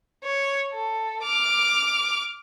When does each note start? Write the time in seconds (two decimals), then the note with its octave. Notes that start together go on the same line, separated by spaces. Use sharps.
0.24 C#5
0.73 A4
1.22 D6 F6